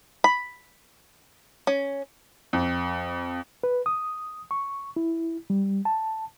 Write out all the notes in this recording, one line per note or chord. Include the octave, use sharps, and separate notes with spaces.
B5
C#4
F2
B4
D#6
C#6
E4
G3
A5